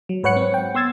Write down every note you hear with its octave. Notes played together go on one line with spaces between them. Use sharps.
F#3
G#2 B4 C#5 F#5 F#6 C#7
C4
G5
B3 C6 E6 G#6 A6